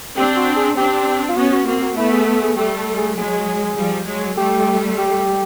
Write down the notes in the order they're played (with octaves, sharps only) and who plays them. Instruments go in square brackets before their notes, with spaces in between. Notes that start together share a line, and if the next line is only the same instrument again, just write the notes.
[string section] C4 D4 [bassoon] G4
[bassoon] F#4
G#4
[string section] C4 D4 [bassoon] G4
[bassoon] F4
[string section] B3 C#4 [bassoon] F#4
[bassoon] F#4
[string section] A#3 C4 [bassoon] F#4
[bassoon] F#4
[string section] A3 B3 [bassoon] E4
[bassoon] G#4
A4
G#4
[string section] G3 A3 [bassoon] G4
[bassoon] A4
G#4
[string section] F#3 G#3 [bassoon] G#4
[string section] F3 G3
F#3 G#3
[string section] G3 A3 [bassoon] G4
[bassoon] G4